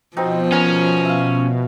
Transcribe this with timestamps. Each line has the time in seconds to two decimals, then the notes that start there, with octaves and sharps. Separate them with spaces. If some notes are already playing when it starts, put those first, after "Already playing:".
0.17 B2 F3 C4 D#4
0.52 C#4 A#4 G#5 C#6
1.05 E5 F5